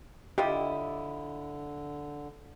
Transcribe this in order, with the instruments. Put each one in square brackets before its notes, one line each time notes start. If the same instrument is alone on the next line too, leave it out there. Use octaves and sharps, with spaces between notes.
[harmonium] D3 [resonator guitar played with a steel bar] E4 [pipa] F4 D#5 [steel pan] G4